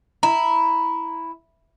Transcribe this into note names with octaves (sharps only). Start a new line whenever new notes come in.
E4 A#5